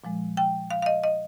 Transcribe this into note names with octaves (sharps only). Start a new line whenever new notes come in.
A#2 F3 G#3
G5
F5
F5
D#5
D#5